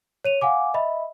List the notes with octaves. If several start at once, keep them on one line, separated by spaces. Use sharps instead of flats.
C#5 D#7 F7
F5 F#5 G#5 D6
D#5 E5 B5